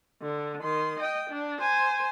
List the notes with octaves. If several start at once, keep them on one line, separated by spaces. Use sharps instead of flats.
D3
D#3 C6
D#5 G5
D4
C5 G#5